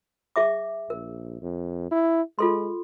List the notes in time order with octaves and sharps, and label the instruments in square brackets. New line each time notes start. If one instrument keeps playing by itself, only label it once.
[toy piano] G#4 E5 D6
[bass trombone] A#1 [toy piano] A#4
[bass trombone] F2
E4
[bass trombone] G#3 [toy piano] F4 A4 C6